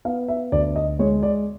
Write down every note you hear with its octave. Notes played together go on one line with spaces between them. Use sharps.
B3 F5
E5
D2 D5
D#5
G#3 C#5
D5